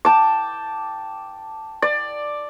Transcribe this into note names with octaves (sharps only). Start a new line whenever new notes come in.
G5 A5 D6
D5